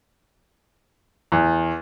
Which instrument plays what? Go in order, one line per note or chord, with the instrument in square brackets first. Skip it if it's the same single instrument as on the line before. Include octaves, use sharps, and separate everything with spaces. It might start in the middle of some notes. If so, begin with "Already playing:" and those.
[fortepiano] E2